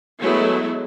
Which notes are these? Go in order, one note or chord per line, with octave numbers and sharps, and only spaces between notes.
F#3 G#3 A3 B3 E4